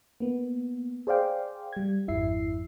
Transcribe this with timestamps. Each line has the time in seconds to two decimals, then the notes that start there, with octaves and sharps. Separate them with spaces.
0.20 A#3 B3
1.07 G#4 C5 D5 F5 G5
1.73 G3 G#6
2.07 G#1 F2 E4 E5 C7